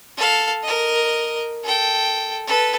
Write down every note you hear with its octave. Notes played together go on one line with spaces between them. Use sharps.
A4 F5
A#4 D#5
A4 G5
A4 B4